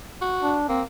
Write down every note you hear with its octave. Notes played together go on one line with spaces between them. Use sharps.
F#4
D4
A#3 C4